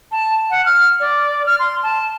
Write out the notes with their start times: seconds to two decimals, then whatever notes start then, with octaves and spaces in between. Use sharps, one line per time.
0.12 A5
0.50 F#5
0.66 F6
1.00 D5
1.46 F6
1.59 C6
1.83 A5